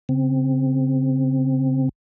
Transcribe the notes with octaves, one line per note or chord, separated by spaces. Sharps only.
C#3 C4